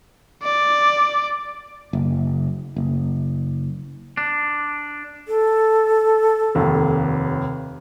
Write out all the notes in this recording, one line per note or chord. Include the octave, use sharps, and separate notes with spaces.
D5
F#1
F#1
D4
A4
F1 D#2